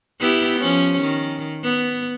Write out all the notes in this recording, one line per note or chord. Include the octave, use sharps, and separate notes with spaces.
B3 E4 G4
F3 C#4
D#3
B3